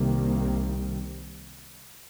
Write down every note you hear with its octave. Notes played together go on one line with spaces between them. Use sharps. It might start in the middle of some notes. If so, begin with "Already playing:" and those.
Already playing: C2 C3 D#3 G3 A#3